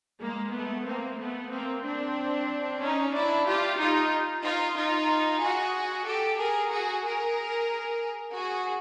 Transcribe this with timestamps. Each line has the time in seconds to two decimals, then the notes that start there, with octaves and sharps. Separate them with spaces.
0.22 G#3 A#3
0.54 A3 B3
0.87 A#3 C4
1.19 A3 B3
1.52 A#3 C4
1.84 C4 D4
2.81 C#4 D#4
3.14 D4 E4
3.46 F4 G4
3.79 D#4 F4
4.44 D#4 F4
4.76 D#4 F4
5.41 F#4 G#4
6.06 G4 A4
6.38 G#4 A#4
6.71 F#4 G#4
7.04 G#4 A#4
8.33 F#4 G#4